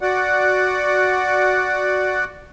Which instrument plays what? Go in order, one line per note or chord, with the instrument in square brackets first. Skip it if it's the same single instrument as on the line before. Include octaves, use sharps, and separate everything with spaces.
[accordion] F#4 D5 F#5